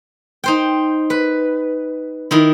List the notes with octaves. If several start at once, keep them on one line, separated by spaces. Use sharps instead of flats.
D#4 C5 G5
B4
D#3 D#4 E4